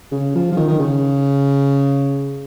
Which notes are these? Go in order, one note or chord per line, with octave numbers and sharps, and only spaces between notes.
C#3
F3
F3
D#3
D#3
C#3